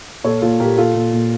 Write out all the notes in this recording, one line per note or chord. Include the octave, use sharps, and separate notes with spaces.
A#2 A4 C#5
A#2 F4 A4
A#2 G4 A#4
A#2 F4 A4
A#2
A#2